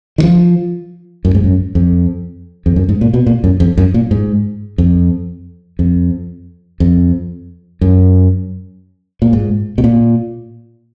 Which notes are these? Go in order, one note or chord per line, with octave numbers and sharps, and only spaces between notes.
D#3
F3
F#2
G#2
F#2
F2
F2
F#2
G#2
A#2
B2
A#2
F#2
F2
F#2
A#2
G#2
F2
F2
F2
F#2
A#2
G#2
B2
A#2